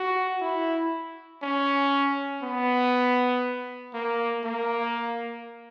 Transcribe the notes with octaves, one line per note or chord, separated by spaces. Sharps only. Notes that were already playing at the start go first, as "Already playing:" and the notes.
Already playing: F#4
E4
C#4
B3
A#3
A#3